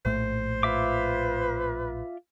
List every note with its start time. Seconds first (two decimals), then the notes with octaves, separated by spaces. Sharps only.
0.05 A#1 A2 A3 C5
0.63 F4 B4 E5 D6